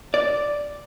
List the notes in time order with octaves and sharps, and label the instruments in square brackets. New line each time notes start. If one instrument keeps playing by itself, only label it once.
[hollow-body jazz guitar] D5